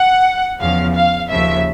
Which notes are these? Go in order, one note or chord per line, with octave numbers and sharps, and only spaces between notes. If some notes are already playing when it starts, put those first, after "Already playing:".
Already playing: F#5
E2 C#3 F3 F5
F5
D#2 C#3 F3 E5